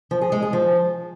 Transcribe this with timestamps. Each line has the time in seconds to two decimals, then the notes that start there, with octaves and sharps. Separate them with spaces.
0.11 F3
0.21 G#4
0.32 G#3
0.42 G#4
0.53 F3